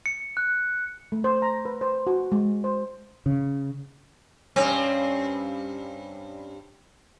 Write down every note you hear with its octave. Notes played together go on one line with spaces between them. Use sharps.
C#7
F#6
A3
C5
A#5
B4
C5
F#4
G#3
C5
C#3
G2 C4 C#4